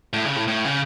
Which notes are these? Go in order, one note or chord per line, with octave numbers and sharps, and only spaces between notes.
A2
C#3
A2
A2
C#3